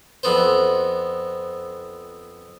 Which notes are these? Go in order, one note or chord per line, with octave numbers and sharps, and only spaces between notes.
F2 B3 C5